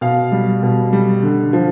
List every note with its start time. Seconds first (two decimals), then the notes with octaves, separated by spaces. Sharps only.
0.01 B2 F5
0.32 G3
0.63 B2
0.93 G3
1.23 D3
1.53 F3